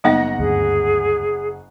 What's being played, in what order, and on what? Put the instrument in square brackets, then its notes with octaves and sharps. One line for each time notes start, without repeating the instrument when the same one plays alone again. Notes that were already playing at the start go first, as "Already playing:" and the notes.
[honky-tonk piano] F#1 F#5 A#6 [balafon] G3 B3 D#4
[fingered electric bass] D2 G2 [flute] G#4